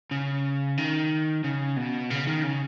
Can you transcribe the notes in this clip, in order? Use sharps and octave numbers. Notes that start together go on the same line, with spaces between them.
C#3
D#3
C#3
B2
C#3
D#3
C#3